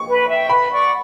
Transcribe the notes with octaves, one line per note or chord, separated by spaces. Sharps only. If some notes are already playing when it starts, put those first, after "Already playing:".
Already playing: C#6
B4
E5 G5
B4 B5
D5 F#5 C#6